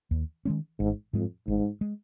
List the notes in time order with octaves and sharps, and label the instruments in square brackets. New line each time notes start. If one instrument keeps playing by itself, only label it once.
[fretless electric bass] D#2
D#3 G#3 C#4
[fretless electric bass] G#1 [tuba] G#2
[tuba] F2 [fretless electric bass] G#2 G#3
[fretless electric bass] G#1 [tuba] G#2
[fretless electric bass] G#3